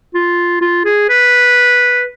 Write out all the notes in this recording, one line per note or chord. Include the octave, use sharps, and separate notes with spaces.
F4
F4
G#4
B4